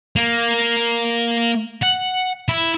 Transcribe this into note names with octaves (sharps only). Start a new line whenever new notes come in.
A#3
F#5
E4